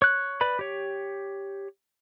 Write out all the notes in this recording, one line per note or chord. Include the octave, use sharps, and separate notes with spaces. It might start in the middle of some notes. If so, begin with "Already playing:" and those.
C#5 F#6
B4 D5 B5
G4 C#5